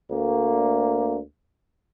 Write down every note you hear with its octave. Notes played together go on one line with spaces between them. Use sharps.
D2 A#3